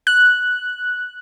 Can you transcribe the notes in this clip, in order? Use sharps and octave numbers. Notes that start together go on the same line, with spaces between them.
F#6